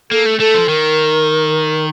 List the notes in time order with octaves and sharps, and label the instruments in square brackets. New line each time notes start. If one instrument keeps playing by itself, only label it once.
[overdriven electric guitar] A#3 [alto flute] A4
[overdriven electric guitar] A3
[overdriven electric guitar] A3 [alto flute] A4
[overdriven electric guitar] F3
[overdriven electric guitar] D#3 [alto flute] A#4